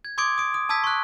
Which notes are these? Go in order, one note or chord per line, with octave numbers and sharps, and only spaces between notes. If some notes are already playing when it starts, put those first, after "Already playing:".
G#6
C6 D6 D#6 G#6 D7
D#6 D7
D#6
A5 D#6 E6 G#6 B6
C#6 F#6